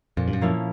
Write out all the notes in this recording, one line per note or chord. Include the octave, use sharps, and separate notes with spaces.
F2 A#2
G2
F#2
F3 A#3 C#4 E4